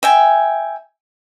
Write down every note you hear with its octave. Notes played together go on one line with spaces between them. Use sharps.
E5 G5 G#5